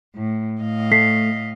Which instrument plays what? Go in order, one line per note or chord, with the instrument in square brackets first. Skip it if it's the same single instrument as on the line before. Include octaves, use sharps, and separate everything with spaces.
[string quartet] A2
A2 D#5 F5
[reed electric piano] A3 [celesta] B6 C7